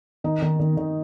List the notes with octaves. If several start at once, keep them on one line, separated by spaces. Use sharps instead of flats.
D#3 D#4
D#3
D#3
D#3